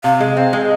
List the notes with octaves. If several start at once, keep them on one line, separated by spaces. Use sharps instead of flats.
C3 F5
G#3
C4
G#3